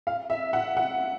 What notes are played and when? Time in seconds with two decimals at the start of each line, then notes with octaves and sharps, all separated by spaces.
0.07 F5
0.30 E5
0.53 F#5
0.77 F#5